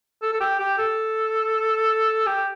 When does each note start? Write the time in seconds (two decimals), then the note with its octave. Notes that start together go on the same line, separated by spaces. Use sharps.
0.22 A4
0.33 A4
0.41 G4
0.59 G4
0.78 A4
2.27 G4